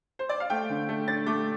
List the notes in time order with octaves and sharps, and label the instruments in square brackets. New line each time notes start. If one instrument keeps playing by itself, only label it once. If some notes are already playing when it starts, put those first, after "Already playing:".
[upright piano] C5
D5
F5
A3 G5
D3
A3
D4 A6
A3 D6